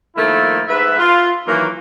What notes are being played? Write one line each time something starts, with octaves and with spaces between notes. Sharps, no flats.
D#3 F3 A3 A#3 D#4 E4
G#2 B4 E5
F4
D#3 E3 F#3 A#3